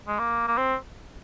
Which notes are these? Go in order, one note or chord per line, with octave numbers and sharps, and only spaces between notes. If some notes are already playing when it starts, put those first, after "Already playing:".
G#3
A#3
A#3
C4